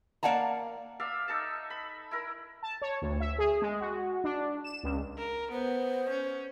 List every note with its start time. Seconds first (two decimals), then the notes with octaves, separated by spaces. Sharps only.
0.23 A#3 D5 F5 F#5 A5 A#5
1.00 D5 E5 F5 D#6
1.28 D#4 A4 E5 A5
1.70 B5
2.11 E4 A#4
2.63 A5
2.82 C#5
3.02 D2
3.20 E5
3.38 G#4
3.62 G#3
3.80 F#4
4.24 D4
4.64 E7
4.83 C#2
5.18 A#4
5.52 B3 C5
6.10 C#4